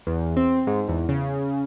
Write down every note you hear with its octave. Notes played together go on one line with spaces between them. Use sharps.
E2
C4
G#2
E2
C#3